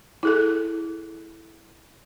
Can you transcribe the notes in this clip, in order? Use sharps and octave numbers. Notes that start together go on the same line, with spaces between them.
E4 G#4 A4